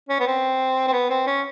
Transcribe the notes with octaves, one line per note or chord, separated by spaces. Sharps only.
C#4
B3
C4
C4
B3
C4
C#4